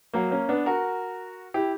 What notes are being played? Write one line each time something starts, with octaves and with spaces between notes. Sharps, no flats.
F#3 A#3
A#3 C#4
B3 D4
F#4 A#4
E4 G4